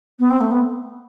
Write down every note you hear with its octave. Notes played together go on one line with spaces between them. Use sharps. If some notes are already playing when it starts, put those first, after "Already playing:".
B3
C4
A3
B3